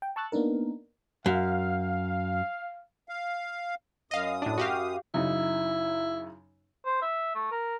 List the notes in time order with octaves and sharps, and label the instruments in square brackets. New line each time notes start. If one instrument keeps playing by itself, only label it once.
[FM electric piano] G5
A5 C#6 E6 F#6 A6
A#3 B3 D4 D#4 A#4
[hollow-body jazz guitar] F#2 [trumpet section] F5
[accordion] F5
[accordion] F#2 D#6 [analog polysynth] D#5 F5
[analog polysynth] A2 D4
F#4 G4 F5
[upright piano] F#2 C#3 D#4 [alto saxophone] E4
[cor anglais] C5
E5
A3
A#4